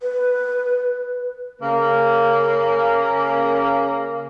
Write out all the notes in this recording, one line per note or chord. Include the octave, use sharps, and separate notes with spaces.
B4
C#3 A#3